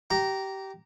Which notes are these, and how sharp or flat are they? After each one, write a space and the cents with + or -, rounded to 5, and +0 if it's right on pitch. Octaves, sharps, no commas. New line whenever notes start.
G4 -20 A#5 +0